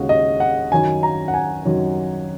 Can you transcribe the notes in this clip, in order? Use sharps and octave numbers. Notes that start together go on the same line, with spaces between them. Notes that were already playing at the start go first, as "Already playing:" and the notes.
Already playing: D#2 C#3 G#3 F#4
D#5
F#5
F#2 D#3 F#3 G#5
A#5
F#5
G#5
F#2 D#3 F#3